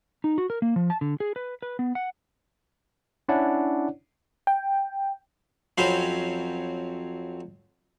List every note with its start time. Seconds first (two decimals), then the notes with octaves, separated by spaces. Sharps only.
0.24 D#4
0.38 F#4
0.50 A#4
0.62 A#3
0.76 F3
0.90 A5
1.01 D3
1.20 G#4
1.36 B4
1.62 B4
1.79 B3
1.95 F#5
3.29 C#4 D4 E4 C#5 D5 F#5
4.47 G5
5.78 F2 F#3 C4 C#4 B5 C6